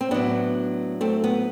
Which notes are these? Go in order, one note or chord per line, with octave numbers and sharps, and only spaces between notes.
C4
A2 F#3 B3 D4
A3 C4
B3